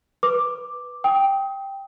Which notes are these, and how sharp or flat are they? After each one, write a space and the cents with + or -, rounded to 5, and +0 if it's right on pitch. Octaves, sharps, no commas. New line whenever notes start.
B4 +0 D6 +0
G5 +0 D#6 +30